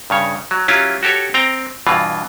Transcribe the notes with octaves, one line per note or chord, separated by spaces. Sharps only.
G2 C#3 C#5
F#3
F#3 C#4 E4 F4 G4
F#4 G4 A4 C#5
C4 G5 A#5
G2 B2 E3 F4